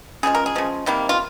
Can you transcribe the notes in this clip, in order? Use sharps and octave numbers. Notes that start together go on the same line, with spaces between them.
C#3 F3 G#3 G#4
A#4
G#4
C#3 F3 G#3
C3 D#3 G3 A#3
F4